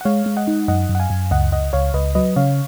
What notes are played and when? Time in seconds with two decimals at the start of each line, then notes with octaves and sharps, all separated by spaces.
0.01 F#5
0.05 G#3 C#5 F5
0.26 G#3
0.37 D#5 F#5
0.48 D#4
0.68 F#2 D#5 F#5
0.89 F#2
0.95 F#5
1.00 F5 G#5
1.10 F#2
1.31 C#2 D#5 F#5
1.52 C#2 D#5 F#5
1.73 C#2 C#5 F5
1.94 C#2 B4 D#5
2.15 F#3 B4 D#5
2.36 C#3 C#5 F5